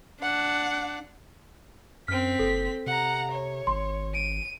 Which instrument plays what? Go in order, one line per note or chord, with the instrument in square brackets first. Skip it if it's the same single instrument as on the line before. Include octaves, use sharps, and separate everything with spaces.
[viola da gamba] D4 [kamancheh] F#5
[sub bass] F#2 [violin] C4 B6 [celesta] F6
[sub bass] F#1 [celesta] A4
[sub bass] C3 [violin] F#5 A#5
[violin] C#5
[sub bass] G#1 [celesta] C6
[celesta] D7 [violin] D#7